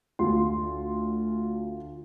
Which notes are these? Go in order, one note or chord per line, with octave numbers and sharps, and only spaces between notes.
D2 F4 C6